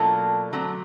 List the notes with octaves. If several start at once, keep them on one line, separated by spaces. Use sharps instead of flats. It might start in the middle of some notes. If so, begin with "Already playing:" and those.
Already playing: B2 F#3 A#3 D4 F4 A4
D3 F#3 A3 C4